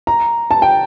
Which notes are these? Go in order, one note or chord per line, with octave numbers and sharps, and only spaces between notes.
A#5
A5
G5